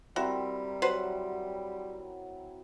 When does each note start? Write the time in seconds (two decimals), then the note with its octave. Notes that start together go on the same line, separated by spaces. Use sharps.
0.16 G3 C4 E4 F#4 A#4
0.82 F#3 B4 C5 F#5